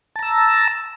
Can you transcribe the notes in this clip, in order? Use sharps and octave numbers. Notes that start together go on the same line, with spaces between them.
A5 A#5 E6